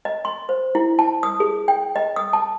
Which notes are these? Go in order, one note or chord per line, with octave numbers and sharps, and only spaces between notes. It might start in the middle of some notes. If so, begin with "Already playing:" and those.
D#5
C6
C5
E4
A5
D#6
G#4
G5
D#5
D#6
A5